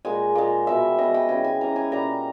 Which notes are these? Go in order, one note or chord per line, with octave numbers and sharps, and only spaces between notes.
A#2 G#3 G#5
A#2 G#3
B2 G3 E5
B2 G3 D#5
G5
C#3 E3 G3 G#5
G#5
C#3 E3 G3 A#5
G#5
A#2 G3 A#5